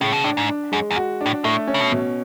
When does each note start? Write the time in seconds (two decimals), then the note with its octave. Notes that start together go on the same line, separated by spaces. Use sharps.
0.01 A2 C#3
0.12 B2
0.24 A2 D4
0.37 G#2
0.48 D4
0.72 F#2 G#3
0.91 E2
0.96 F#4
1.21 D4
1.26 A2
1.44 A2 A3
1.67 C#4
1.74 C#3
1.80 B2
1.92 B2